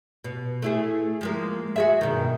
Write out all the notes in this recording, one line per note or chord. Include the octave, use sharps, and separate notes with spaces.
B2
A3 E4 G#4
F3 G#3 A#3
F#4 G#4 E5
G2 B2 D#3